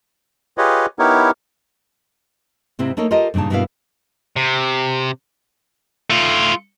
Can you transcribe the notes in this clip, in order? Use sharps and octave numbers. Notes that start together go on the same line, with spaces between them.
F4 G4 G#4 B4 C#5 D#5
B3 D#4 E4 G4 A#4 C#5
G#2 C3 C4 E4
A3 A#3 D#4 A4 A#4 C#5
F4 G4 A4 A#4 C5 D#5
G2 A#2 C#3 D#4 A5
G2 B2 A#3 B3 E4 F5
C3
A3 F4